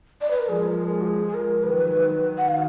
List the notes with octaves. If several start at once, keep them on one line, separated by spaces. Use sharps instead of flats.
D5
B4
A#4
F3 G#3 G#4
A#4
G#4
F#4
G#4
G#4
A#4
D#3 F#3 B4
F#5
F5